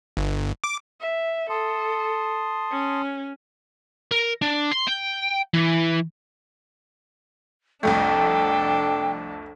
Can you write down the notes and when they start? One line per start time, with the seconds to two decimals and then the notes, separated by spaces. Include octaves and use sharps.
0.17 G1
0.64 D6
1.01 E5
1.50 A4 A5 C6 D#6
2.71 C#4
4.11 A#4
4.42 D4
4.71 C6
4.87 G5
5.54 E3
7.83 C2 F2 A3 D4 A4 G5